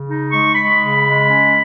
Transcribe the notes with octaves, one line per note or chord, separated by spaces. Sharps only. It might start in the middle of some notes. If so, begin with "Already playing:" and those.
Already playing: C#3
D#4
G#3 C#6
G#3 B5
C#3
G#3
C#4